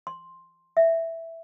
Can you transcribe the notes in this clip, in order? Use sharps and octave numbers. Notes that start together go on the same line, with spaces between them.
C6
E5